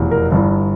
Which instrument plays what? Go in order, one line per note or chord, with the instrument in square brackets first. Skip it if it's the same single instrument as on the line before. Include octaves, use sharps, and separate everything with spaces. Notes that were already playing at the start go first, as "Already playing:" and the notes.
Already playing: [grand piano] F1 E2 B2
A#4
G1 G2 E3